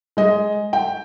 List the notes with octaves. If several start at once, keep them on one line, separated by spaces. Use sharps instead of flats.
G#3 D#5
G5